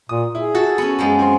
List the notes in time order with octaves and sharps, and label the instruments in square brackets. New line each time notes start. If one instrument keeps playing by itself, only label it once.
[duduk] A#2 [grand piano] D#6
[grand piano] E4 [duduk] G#4
[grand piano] F#4 [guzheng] A4
[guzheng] B3 C#4
F#2 F3 G#3
[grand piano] C4 G#5 C6